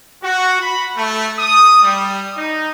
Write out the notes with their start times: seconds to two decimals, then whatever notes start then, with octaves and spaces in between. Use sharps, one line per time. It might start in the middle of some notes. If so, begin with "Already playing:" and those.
0.23 F#4
0.60 B5
0.96 A3
1.38 D#6
1.83 G3
2.37 D#4